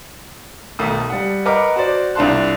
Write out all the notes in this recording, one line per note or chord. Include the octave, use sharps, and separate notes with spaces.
B1 D#3 A3 D#6
G3 F#5
A#4 B4 D#5 F#5 D6 F6
F#4 C5 D5
C2 D4 F4 A5 C6 F#6